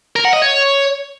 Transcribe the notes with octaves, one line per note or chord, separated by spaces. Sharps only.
A#4
F#5
D#5
C#5